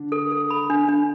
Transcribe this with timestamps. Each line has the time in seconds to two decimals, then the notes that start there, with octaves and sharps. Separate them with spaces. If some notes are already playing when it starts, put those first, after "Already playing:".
Already playing: D3 D4
0.12 A4
0.31 A4
0.50 B5
0.70 D4
0.89 D4